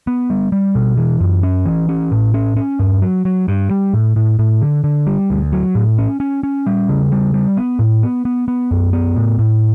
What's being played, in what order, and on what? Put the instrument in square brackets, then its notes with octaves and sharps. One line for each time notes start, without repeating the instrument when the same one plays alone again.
[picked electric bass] B3
G3
G3
B2
E3
F#2
C#4
E3
C#4
A2
C#4
C#4
G2
F#3
F#3
G2
G3
A2
A2
A2
D3
D3
G3
D2
F#3
A2
C#4
C#4
C#4
G3
C#3
G3
G3
B3
A2
B3
B3
B3
F#2
B3
A2
A2